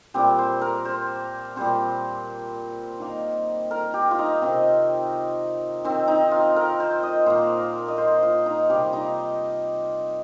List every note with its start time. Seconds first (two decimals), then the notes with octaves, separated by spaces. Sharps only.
0.14 A#2 G3 C4 G4
0.38 C5
0.61 A#4
0.85 C5
1.56 A#2 G3 C4 C5
3.00 D#3 A#3
3.71 A#4
3.94 G4
4.11 F4
4.19 D#4
4.42 C3 D#3 C4
5.84 D#3 C4
6.08 D#4
6.31 F4
6.56 A#4
6.80 C5
7.03 D#5
7.26 A#2 A#3 C5
7.88 D#5
7.98 C5
8.23 F4
8.46 D#4
8.70 C3 G3 A#3 G4
8.93 D#4